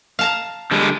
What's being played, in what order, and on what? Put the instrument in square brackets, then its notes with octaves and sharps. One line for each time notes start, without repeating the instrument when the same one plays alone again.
[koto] F5 A5 A#5
[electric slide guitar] D3 G3 G#3